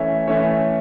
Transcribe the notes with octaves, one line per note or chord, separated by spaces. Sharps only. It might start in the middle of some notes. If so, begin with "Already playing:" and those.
Already playing: E3 A3 C#4 C#5 E5
E3 A3 C#4 C#5 E5